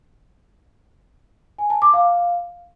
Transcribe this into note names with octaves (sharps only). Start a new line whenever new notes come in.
G#5
A5
D6
F5